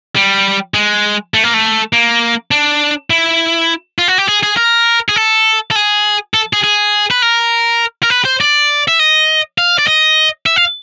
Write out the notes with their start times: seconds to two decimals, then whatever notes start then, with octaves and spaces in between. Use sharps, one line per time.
0.16 G3
0.74 G#3
1.34 A3
1.43 A#3
1.54 A3
1.93 A#3
2.51 D4
3.10 E4
3.99 F4
4.08 F#4
4.18 G4
4.28 G#4
4.43 G#4
4.57 A#4
5.09 G#4
5.16 A4
5.71 A4
5.76 G#4
6.34 A4
6.53 G#4
6.64 G#4
7.11 B4
7.22 A#4
8.03 A#4
8.10 B4
8.25 C5
8.41 D5
8.88 E5
8.99 D#5
9.58 F5
9.79 D5
9.87 D#5
10.46 E5
10.56 F5